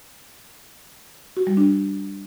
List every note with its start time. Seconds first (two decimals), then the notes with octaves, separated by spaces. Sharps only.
1.37 F#4
1.47 G3
1.57 D4